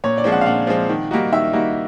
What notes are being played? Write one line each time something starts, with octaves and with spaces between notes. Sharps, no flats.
A#2 C#5
D5
F3 G#3 C4
F#5
F5
A#2 F#5
F3 G#3 C4
D#3
G3 A#3 D#4 F#4
D#3 E5
G3 A#3 D#4 F#4